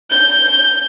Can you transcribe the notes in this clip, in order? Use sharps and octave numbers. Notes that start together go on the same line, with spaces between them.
G6